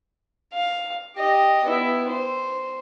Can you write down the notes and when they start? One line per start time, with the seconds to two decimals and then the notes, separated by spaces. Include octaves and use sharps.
0.53 F5
1.17 G4 D#5
1.64 B3 E4
2.08 C5